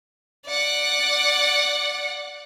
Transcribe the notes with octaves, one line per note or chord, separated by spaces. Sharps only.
D5 F#5